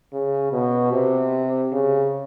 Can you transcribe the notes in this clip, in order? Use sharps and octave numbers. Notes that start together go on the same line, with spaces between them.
C#3
B2
C3
C#3